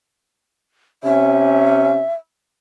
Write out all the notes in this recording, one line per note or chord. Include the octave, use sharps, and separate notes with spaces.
C3 C#4 E5